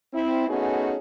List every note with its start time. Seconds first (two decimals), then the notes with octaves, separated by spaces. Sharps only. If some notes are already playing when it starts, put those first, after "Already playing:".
0.14 C4 E4
0.48 A3 B3 C#4 D#4 F#4 G#4